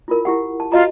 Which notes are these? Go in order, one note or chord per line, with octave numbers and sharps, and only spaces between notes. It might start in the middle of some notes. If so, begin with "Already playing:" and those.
E4 F4 A#4
E4 G4 F#5
A5
F4 F#4 D#5 A#5